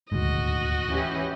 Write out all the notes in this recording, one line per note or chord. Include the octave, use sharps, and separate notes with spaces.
D#1 D2 G#2 F#4 D#5
E3 C#4 G4